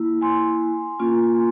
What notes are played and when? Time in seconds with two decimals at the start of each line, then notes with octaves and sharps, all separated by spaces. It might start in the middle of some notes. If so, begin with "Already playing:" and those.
Already playing: A#3 E4
0.21 G#5 C6
1.00 A#3 C#4 F4